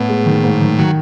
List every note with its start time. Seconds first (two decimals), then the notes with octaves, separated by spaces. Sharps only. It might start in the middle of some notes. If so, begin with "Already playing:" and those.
Already playing: A2 B3
0.09 G#3
0.26 D#3
0.44 G#2
0.61 D#3
0.78 D#3 F#3